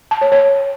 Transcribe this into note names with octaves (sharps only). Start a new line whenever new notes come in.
A5
C#5
C#5